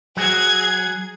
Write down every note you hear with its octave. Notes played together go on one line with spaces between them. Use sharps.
F#3 G#4 G#6